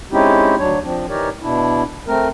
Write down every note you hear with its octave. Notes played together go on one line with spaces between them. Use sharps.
G#3 C4 C#4 D#4 E4 G4
D2 F#3 D4 C#5
F3 C4 D4
E3 D#4 G4 A#4 C#5 D5
B2 D4 E4
A3 C4 A#4